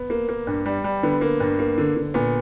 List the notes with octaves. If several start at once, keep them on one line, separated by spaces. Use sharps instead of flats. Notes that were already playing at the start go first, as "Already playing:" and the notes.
Already playing: B3
A#3
A#3
G2
G3
G3
D3 B3
A#3
G2
A#3
D3
D3
A#2 B3